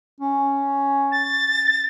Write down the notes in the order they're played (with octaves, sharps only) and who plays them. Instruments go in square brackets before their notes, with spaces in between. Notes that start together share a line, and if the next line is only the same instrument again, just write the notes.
[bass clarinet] C#4
[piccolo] A6